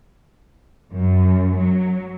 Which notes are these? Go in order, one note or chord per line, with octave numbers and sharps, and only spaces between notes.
F#2
F#3